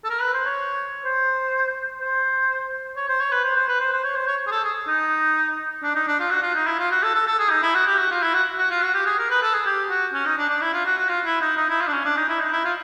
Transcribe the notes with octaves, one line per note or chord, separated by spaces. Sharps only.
A4
A#4
B4
C5
C#5
C5
C5
C#5
C5
C#5
B4
C5
C5
B4
C5
C5
C#5
C5
C#5
G#4
A4
G#4
D#4
D4
D#4
D4
F4
F#4
F4
D#4
E4
F4
F#4
A4
A4
A4
G#4
D#4
E4
F#4
G4
F#4
F4
E4
F#4
F#4
F4
F#4
G4
G#4
A#4
B4
A4
G#4
G4
F#4
C#4
D#4
D4
D4
E4
F4
F#4
F#4
F4
E4
D#4
D#4
E4
F4
D4
C#4
D4
D#4
E4
D#4
E4
F4